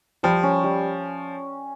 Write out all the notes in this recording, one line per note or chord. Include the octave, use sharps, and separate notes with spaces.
F3 G3
C#4
G3